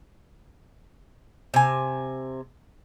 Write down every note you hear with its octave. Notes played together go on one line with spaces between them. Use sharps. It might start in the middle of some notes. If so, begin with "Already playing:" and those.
C3 G#5